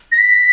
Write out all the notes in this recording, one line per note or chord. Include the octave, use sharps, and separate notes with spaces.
A#6
B6